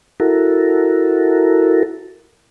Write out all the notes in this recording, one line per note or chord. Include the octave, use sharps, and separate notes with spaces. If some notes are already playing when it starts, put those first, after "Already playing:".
E4 F#4 A4 A#4